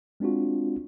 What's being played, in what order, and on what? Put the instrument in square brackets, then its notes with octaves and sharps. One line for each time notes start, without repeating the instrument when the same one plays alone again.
[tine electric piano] G#3 C4 D4 F4 F#4